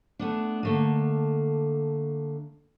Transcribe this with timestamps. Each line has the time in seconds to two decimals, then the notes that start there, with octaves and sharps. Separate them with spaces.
0.19 A3 B3 D4
0.63 D3 A3 A#3